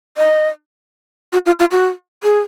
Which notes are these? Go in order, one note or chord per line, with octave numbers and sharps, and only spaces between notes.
D#5
F#4
F4
F4
F#4
G#4